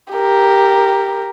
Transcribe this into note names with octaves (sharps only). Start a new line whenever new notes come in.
G4 A#4